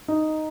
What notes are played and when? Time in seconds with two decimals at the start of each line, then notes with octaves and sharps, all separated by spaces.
0.08 D#4